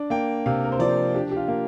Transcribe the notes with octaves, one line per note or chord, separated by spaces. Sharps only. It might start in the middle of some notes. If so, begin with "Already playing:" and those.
Already playing: D4 D5
A#3 G5
C3 F5
A#4
C5
F3 D5
D4 G4
G4
F4
A#3